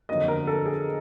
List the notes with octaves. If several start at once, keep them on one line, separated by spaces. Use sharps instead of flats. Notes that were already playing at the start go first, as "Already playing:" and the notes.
F2 D3 F#3 A#3 D#5
A#4
A4
G#4